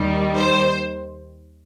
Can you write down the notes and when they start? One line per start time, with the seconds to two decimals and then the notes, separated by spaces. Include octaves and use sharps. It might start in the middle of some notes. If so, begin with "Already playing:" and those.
Already playing: D#2 D#3 G3
0.36 C5